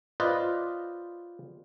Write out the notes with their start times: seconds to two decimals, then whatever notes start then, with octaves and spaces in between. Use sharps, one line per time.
0.20 F4 B4 C5 D5 D#5